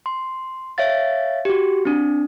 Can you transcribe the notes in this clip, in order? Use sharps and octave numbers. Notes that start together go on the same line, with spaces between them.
C6
C#5 E5 F5 A6
F#4 G4
C4 D4